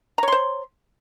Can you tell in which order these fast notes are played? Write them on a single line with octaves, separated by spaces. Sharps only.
A#5 C#5 C6 C5